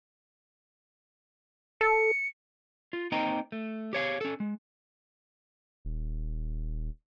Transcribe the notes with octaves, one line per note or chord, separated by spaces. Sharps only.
A4 C#7
F4
A#3 C4 D#4 D#5 G5 A#5
A3
G4 C#5 F5
C#4 A4
G#3
D#1